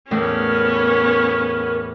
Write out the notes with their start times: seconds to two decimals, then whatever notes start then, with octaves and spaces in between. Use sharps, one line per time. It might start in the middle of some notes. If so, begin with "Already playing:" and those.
0.11 E2 A2 B3 C#4 A#4